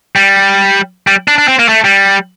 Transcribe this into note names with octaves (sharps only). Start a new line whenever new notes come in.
G3
G3
D4
D4
C4
A#3
A3
G3